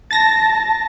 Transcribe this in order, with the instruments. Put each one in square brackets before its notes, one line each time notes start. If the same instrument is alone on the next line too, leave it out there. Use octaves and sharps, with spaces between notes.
[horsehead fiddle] A5 [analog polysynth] A6 A#6